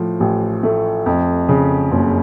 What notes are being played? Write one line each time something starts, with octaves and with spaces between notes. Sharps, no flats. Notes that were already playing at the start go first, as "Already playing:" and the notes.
Already playing: A2 F3
A1
A3
F2
C#3
F#1